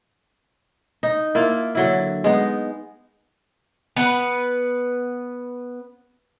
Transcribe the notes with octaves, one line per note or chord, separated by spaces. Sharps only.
D#4
A#3 E4 F4
D3 F#3 E4
G#3 B3 D#4
B3 B4